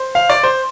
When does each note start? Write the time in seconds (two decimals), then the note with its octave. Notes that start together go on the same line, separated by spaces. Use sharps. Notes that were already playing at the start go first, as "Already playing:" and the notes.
Already playing: C5
0.15 F5
0.30 D5
0.43 C5